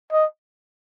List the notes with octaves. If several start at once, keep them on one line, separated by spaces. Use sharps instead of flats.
D#5